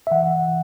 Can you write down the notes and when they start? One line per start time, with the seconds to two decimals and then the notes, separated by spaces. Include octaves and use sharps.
0.07 E5
0.11 E3 F#5